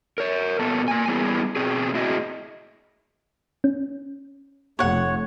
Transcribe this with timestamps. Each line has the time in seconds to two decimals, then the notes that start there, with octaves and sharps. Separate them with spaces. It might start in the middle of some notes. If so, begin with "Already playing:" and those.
0.18 A#4 C#5
0.59 A#2 B3 A4
0.88 A#3 G#5
1.08 G3 B3 C#4 E4 G#4
1.56 B2 C4 G#4
1.94 A2 C4 E4 F#4 G#4 D#5
3.64 C#4
4.79 F1 A3 C#5 F#5